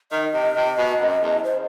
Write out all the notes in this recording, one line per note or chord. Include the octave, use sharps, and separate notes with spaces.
D#3 D#5
C3
C3
B2
F#2
E2
C5